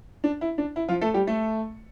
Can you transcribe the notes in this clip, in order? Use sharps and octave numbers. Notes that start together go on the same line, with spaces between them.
D4
E4
D4
E4
F3 F4
A3 A4
G3 G4
A3 A4